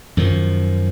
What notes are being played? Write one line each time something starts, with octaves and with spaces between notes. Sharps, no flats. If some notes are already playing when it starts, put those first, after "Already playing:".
F#2 D#3 F3